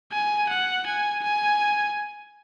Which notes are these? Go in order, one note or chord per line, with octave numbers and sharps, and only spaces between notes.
G#5
F#5
G#5
G#5